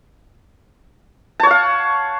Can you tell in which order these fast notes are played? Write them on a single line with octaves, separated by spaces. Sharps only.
A5 C#5 F#5 F5